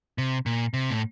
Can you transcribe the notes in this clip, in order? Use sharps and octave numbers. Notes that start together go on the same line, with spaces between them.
C3
A#2
C3
A2